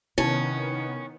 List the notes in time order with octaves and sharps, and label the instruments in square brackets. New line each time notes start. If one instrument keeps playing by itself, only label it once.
[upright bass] C3 [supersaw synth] D#3 B3 [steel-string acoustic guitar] C#4 [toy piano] D#4 E4